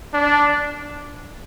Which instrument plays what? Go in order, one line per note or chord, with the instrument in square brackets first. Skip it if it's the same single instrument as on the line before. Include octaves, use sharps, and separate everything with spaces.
[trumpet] D4